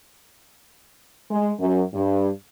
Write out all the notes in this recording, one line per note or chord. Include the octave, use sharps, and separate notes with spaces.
G#3
F#2
G2